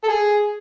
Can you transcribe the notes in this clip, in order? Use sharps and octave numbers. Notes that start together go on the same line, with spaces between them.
A4
G#4